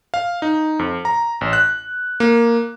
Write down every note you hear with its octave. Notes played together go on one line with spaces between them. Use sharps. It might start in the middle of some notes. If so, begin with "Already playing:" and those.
F5
D#4
F2
A#5
A1
F#6
A#3